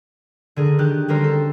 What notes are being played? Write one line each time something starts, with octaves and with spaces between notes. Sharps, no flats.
D3 G#4 A#4
D#3 G4 F#6
D3 D#3 G3 C#4 A#4 C5
A4